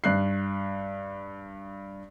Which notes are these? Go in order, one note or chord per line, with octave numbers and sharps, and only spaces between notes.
G2 F#6 C7